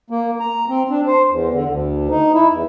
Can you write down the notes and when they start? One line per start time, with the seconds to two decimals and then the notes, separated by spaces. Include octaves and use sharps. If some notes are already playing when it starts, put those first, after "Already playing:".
0.10 A#3
0.40 A#5
0.69 C4
0.90 D4
1.07 C5
1.31 E2
1.54 D3
1.69 D2
2.10 D#4
2.35 E4
2.52 E2